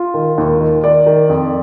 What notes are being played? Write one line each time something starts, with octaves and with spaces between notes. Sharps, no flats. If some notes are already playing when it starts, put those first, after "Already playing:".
Already playing: F4
D#3
D#2
D#3
D#3 D5
D#3
F2